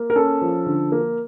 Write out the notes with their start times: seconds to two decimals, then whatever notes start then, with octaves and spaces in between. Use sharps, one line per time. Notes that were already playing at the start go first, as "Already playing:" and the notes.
Already playing: A#3
0.10 A#4
0.16 C#4 A4
0.41 F3
0.66 D3
0.92 A#3